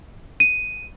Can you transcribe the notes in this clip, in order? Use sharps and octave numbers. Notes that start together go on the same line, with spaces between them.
D#7